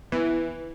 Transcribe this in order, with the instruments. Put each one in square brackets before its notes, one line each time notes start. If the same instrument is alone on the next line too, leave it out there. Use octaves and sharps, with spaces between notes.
[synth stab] E3 [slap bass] B3